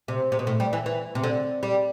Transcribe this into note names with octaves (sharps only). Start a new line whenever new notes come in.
C3
C3
B2
A2
G3
E3
E3
C3
D3
G3